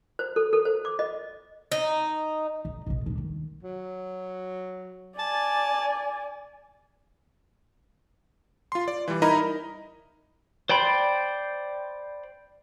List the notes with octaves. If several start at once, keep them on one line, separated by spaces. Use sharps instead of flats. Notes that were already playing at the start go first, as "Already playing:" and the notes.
C5
A4
A4
C5
D6
D#5
D#4
G1
F1 A#1
C#4 D4
D#3
F#3
D5 G#5 A5
F4 C6
D5
E3 G3
D#4 E4 A#4 D#5 A#5 B5
C5 D5 G5 B5 C6